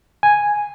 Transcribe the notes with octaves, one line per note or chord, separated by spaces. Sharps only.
G#5